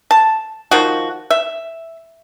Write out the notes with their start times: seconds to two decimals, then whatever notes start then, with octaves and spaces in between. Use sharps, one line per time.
0.11 A5
0.71 D#3 F3 F#4
1.30 E5